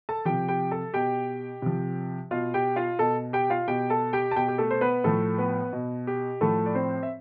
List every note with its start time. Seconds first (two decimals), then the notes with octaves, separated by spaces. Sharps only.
0.09 A4 A5
0.25 C3 F3 G4 G5
0.48 G4 G5
0.71 A4 A5
0.94 B2 G4 G5
1.62 C3 F3
2.31 B2 F4 F5
2.54 G4 G5
2.76 F4 F5
2.99 B2 A4 A5
3.33 G4 G5
3.50 F4 F5
3.68 B2 G4 G5
3.90 A4 A5
4.13 G4 G5
4.31 A5
4.36 B2 G4 G5
4.48 G4
4.58 A3 A4
4.71 C5
4.81 B3 B4
5.04 A2 F3 A3 A4
5.38 B3 B4
5.73 B2
6.07 G4
6.41 A2 F3 A3 A4
6.66 D5
6.75 C4 C5
7.03 E5